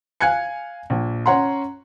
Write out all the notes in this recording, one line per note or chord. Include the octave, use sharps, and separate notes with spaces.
F5 G#5 F#6 G#6 C#7
A#1
C#4 C#5 F#5 A#5 C6